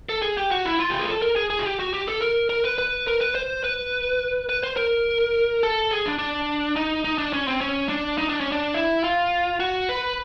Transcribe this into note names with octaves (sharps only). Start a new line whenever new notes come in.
A4
G#4
G4
F#4
E4
F4
G4
G#4
A4
A#4
G#4
G#4
F#4
G4
F#4
G4
A4
A#4
A#4
B4
B4
A#4
B4
C5
B4
B4
C5
A#4
A4
G#4
D4
D4
D#4
D#4
D4
C#4
C4
C#4
D4
D#4
D4
C#4
D4
E4
F4
F#4
B4